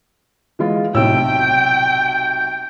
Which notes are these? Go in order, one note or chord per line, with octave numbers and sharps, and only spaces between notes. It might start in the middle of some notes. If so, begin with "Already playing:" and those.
E3 G#3 F4
B1 A2 C3 G5 E6
G6